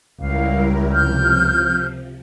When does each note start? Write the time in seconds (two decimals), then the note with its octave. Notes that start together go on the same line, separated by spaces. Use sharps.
0.21 C#2 G3 E4 A#4 F5
0.92 C3 F3 F6 G6